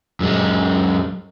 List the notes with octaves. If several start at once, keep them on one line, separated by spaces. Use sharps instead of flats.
F#2 G#3